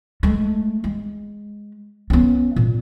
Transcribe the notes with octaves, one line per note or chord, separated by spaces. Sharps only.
G#3 A3
G#3
B3 C#4
A#2